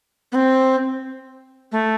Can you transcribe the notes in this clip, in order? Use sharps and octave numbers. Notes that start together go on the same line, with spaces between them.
B3
C4
A3